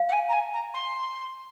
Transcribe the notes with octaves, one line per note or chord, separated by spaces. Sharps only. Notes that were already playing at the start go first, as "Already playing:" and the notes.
Already playing: F5
F#5
G#5
A#5
G#5
A#5
C6